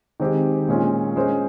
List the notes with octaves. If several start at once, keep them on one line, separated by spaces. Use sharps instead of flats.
D#3 G#3 C4 G4
A#2 G#3 C#4 F4
G#3 C#4 G#4 C5